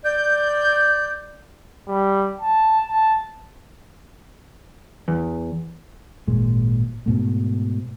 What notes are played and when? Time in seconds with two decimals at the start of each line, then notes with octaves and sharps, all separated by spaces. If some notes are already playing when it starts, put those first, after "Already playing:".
0.05 D5 G6
1.88 G3
2.42 A5
2.89 A5
5.08 E2
6.28 G#1 A#2 G#3
7.06 G#2 B2 A3